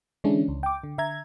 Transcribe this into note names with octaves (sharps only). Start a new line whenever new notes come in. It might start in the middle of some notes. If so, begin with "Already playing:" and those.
D3 E3 G#3 C#4 D4 E4
C#2
G5 D6
D3
D3 E5 A#5 G#6